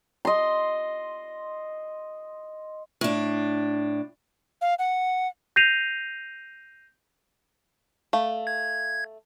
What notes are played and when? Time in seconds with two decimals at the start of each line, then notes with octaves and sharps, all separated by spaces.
0.25 D#5 C6
3.01 A2 D4
4.61 F5
4.79 F#5
5.56 G6 A#6 C7 D#7 F7
8.13 A3 F5
8.47 G#6